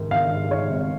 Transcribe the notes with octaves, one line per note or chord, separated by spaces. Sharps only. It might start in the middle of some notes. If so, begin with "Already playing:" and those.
Already playing: G#2 D#3
D#3 F5
G#2
G#2 C#5
G#1